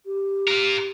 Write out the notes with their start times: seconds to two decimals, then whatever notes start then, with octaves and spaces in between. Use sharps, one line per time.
0.06 G4
0.48 F4 A#4